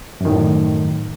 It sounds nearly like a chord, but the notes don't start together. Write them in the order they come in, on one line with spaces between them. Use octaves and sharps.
F#2 D#3 A2